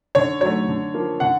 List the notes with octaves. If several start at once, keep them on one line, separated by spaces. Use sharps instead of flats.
D3 C#5
F#3 C#5
A3
D3
F3 A#3
D3 F#5